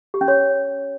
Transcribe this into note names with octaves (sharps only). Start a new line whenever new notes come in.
G4
C#4
C#5